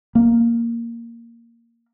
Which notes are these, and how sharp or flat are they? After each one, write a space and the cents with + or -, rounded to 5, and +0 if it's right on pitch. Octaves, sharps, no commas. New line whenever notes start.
A#3 -5